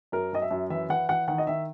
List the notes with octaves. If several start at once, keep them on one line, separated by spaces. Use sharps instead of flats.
F#2 A#4
F#2 D#5
E5
F#2
E3 E5
E3 F#5
E3 F#5
D#3 F#5
D#5
D#3 E5